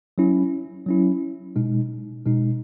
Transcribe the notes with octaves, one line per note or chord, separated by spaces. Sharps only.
F#3 C#4 E4
F#3 C#4 E4
B2 G#3 D#4
B2 G#3 D#4